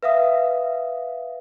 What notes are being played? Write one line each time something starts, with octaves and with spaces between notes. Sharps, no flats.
B4 E5 F5 D#6